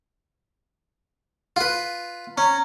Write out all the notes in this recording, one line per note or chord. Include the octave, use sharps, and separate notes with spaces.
F4 B4
C#4 A#5